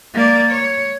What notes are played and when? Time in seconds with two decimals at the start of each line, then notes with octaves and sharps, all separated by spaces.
0.15 A#3 D5
0.52 C#5